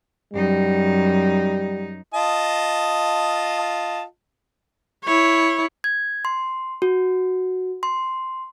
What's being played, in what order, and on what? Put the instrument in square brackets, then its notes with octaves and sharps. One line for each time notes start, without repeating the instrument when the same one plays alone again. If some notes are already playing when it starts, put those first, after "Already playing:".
[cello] F#2 D#4 [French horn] G3
[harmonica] F4 D#5 A5
[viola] E4 C#5
[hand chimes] G#6
C6
F#4
C6